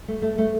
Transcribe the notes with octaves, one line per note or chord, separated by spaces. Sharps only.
A3
A3
A3